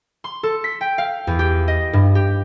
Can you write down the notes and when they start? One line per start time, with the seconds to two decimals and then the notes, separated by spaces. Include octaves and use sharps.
0.24 C6
0.43 A4
0.64 B6
0.81 G5
0.98 F5
1.27 E2
1.39 G4
1.68 D#5
1.93 G2
2.15 G4